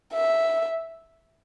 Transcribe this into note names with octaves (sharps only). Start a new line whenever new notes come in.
E5